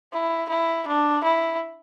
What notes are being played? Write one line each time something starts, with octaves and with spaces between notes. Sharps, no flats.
E4
E4
D4
E4